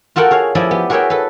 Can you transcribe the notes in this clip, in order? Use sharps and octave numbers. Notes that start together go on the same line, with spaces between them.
F4 F#4 A4 A#4 F#5 G5
G#4 C#5 F5
F3 E4 G#4 D5 D#5
B3 G4
F#4 G#4 A#4 C#5 E5 G5
A4 B4